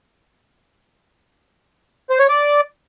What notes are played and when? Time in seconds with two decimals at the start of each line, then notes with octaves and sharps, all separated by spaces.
2.10 C5
2.19 C#5
2.29 D5